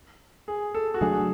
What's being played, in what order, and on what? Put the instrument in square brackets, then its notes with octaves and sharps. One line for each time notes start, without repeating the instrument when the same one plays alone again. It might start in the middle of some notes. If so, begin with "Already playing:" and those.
[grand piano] G#4
A4
F#4
[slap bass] C#3 F#3 A3 D4 [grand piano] G#4